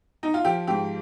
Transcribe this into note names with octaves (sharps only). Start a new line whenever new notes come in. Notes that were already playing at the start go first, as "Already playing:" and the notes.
D#4
F4
F3 G4
G#2 G4